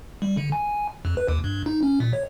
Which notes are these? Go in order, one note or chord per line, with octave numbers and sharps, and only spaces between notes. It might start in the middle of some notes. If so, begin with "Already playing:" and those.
G3
D3
G#5
F2
B4
D#2
G2
D#4
C#4
A#2
C#5